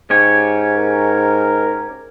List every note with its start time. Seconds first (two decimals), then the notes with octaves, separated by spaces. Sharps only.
0.10 G#2 C#4 G4 C#5
0.76 A#4